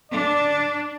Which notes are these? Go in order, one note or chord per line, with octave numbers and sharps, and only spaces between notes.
D4 D5